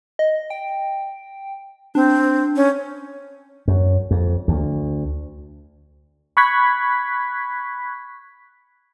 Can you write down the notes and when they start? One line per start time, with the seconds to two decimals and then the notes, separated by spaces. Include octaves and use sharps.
0.19 D#5
0.50 G5
1.95 C4 D4
2.56 C#4
3.68 F#2
4.11 F2
4.48 D2
6.37 B5 C#6 F#6 G#6 B6